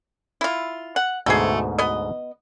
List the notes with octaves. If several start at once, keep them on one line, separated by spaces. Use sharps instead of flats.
E4 F4
F#5
D2 G#2 B2 A3 G#4
B3 D#5